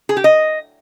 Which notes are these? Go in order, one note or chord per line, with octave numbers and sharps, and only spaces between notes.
G#4
G4
D#5